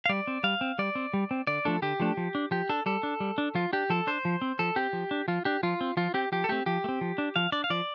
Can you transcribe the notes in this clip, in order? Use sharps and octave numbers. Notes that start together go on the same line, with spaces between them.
F5
G3 D5
C4
G3 F5
C4
G3 D5
C4
G3
C4
D3 D5
F3 A3 D4 A4
D3 G4
F3 A3 D4
F3
D4
F3 G4
D4 A4
G3 A4
D4
G3
D4
F3 F4
D4 G4
F3 A4
D4 C5
F3
C4
F3 A4
C4 G4
F3
D4
F3 F4
D4 G4
F3 F4
C4
F3 F4
C4 G4
F3 G4
A4
A3 C4 G4
F3 G4
A3
C4
F3
D4
F3 F5
D4 D5
F5
F3 D5